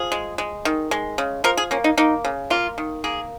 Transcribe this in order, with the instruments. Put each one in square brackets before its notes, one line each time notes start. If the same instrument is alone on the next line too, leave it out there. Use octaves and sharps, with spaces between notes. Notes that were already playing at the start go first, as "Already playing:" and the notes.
Already playing: [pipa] F3 G#4
G#3
G#3
D#3
G#3
C#3
F3 A#4
G#4
A#3 C#4
D#4
A#3 D#4
C#3
A#3 F4
D#3
A#3 G#4